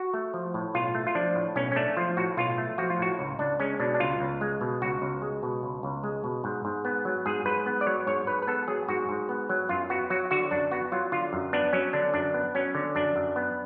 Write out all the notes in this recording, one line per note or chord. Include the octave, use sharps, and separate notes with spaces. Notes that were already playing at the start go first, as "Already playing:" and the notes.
Already playing: F#4
A3
F3
A2
B1 F4
A3
F4
F3 D4
A2
B1 C#4
C#4
A3 D4
F3 F4
A2 F#4
B1 F4
A3
F3 F#4
F4
A2 F#4
C#2
C#2 D4
G#3 C#4
B2 D4
D4
C#2 F4
C#2
G#3
B2
C#2 F#4
C#2
G#3
B2
C#2
C#2
G#3
B2
G#2
G#2
B3
F#3
G#2 G#4
G#2 B4
B3
D5
F#3 C#5
G#2 C#5
G#2 B4
B4
B3 A4
F#3 G#4
G#2 F#4
G#2
B3
F#3
F#2 F4
B3 F#4
F#3 F#4
D3 F#4
F#2 D4
B3 F#4
F#3 F4
D3 F4
F#2
B3 D4
F#3 C#4
D3 D4
F#2 D4
B3
F#3 C#4
D3
F#2 D4
F#2
B3